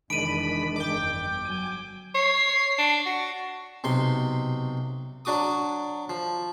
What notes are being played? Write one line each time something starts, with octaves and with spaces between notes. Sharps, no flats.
F1 D#3 E3 G#3 D4 B5 D7 D#7
G1 F2 G5 D6
F#3 G#5
C#5 C7
D4
F#4
B1 C3 C6
F#3 D4 F#4 D6 D#6
F3